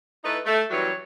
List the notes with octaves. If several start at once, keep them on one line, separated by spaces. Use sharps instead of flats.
A3 D#4 E4 B4
A3
F#2 E3 F#3 G3 C#5